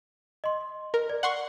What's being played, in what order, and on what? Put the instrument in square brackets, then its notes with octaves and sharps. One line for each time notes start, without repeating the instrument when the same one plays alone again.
[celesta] D#5 C6
[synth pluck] A#4
[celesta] D5
[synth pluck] F#5 C6 C#6